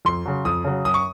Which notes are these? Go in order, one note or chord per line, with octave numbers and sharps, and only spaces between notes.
F2 C6
C#3 F#3
F2 D#6
C#3 F#3
F#2 D#6
C#6